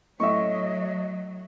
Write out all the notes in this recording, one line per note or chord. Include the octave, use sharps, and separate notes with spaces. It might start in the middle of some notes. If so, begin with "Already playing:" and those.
A2 F#3 D#5 E5 C#6